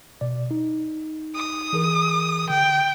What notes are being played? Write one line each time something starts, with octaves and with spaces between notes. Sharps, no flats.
B2 D5
D#4
D#6
E3 G#4 A#4
D3 G5